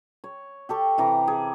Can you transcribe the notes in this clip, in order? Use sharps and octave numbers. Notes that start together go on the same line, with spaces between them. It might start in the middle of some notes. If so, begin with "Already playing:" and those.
C#5
G4 A4 C#6
C3 E3 A#5
G#4